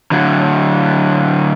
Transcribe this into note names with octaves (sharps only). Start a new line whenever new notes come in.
D3 F#3